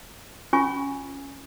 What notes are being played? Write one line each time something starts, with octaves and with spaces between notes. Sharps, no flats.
C#4 F4 G#5 C#6